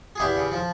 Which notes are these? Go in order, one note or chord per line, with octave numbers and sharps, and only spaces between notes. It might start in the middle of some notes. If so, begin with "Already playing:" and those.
G#4
E2 E4 G4
C#3
F3